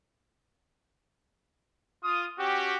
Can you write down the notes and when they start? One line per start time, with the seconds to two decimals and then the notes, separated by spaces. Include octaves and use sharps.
2.04 F4 D#6
2.39 C#4 F#4 G4